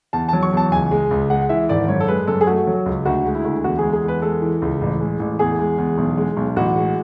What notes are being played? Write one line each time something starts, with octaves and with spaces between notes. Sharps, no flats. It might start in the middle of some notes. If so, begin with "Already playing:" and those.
E2 A5
F#3 A5
C#6
E2 A5
C#2 G#5
G#3
C#2
G#3 F#5
E3 E5
G#1 D5
F#2 C#5
A4
G#3 B4
F#2 A4
G#4
A3 F#4
F#3
C#2
D2 F#4
G#3
E4
D2
E2 F#4
G#3 G#4
G#4
E2 B4
G#3 A4
E3
C#2
A1
G#3
A1
E2 G#4
G#3
E2
B1
G#3
B1
A1 F#4
G#3